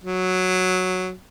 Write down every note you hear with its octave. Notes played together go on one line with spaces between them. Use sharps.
F#3